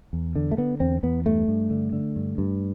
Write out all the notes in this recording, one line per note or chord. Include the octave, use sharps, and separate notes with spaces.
E2
D3
A3
D3 B3
E2 C4
E2 B3
G2 A3
G2
D3
D3
G2
G2